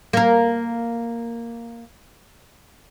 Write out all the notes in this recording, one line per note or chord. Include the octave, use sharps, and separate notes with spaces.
A#3 A#4